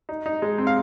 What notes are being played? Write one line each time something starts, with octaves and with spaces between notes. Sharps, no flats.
D#4
D#4
G#3
C4
F5